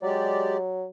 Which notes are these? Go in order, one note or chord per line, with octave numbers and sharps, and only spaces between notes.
F#3 G#3 G4 D5